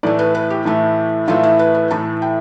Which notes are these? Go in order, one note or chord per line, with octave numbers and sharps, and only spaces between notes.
A2 E3 A3 D5
B4
B4
G4
A2 E3 A3
A2 E3 A3 F4
E4
B4
B4
A2 E3 A3 A5
G5